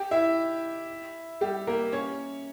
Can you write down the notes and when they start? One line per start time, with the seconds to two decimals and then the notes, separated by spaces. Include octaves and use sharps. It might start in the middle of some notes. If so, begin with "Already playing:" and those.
Already playing: G4 G5
0.11 E4 E5
1.41 G3 G4
1.67 A#3 A#4
1.92 C#4 C#5